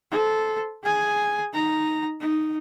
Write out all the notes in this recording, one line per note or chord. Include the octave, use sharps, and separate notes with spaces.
A4 C5
G#4 G#5
D#4 A#5
D#4